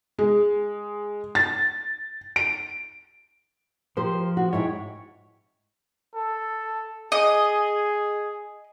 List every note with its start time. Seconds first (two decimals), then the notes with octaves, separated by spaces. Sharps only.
0.19 G#3
1.35 A6
2.36 D7
3.97 F3 G4 A#4 C5
4.37 F#4
4.53 G#2 E4 C#5 G5
6.15 A4
7.12 G#4 D#5